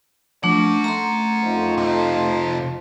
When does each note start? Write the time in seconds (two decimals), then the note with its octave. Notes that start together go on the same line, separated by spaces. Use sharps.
0.44 F3 A3 C#4 D4 F#5
0.84 A3 A#5 C6
1.43 F2 D#4 C5
1.77 C3 F3